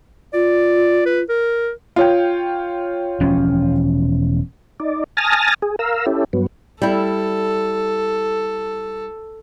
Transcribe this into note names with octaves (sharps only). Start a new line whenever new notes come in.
F4 D5
B4
A#4
F4 C#5 G5
E1 F3 C#4
D#4 D5
G#5 A5 D#6 F6 A6 A#6
G#4
A#4 F5 A#5 E6
C#4 E4 G4 A4
G2 F#3 B3
G3 E4 A4